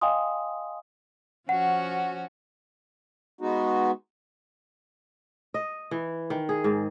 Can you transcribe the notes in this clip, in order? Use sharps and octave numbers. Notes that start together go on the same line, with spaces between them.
D#5 F5 G5 G#5 C6 D#6
F3 C#4 F#4 F#5
G#3 B3 D#4 F#4
D#5
E3
D#3
G#4
G#2